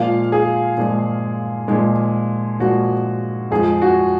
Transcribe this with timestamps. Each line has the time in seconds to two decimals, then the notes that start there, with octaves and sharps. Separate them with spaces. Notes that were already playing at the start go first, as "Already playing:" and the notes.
Already playing: A#2 F3 G#3 F5
0.32 G#4
0.77 A#2 F3 G#3
1.68 A#2 F3 G#3
2.60 A#2 F3 G#3 F#4
3.51 F2 F3 G#3 G#4
3.82 F#4